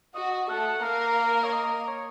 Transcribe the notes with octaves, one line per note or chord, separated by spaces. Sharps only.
F#4 D#5
D#5
A3 A4 F#5
A#3 A#4 F5
C#5
D#5
C#5